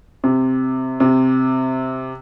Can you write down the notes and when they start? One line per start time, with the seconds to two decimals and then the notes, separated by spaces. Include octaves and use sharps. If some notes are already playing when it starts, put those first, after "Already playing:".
0.24 C3
1.00 C3